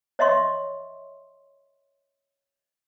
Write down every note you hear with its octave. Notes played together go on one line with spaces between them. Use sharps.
C#5 D#5 E5 C6 C#6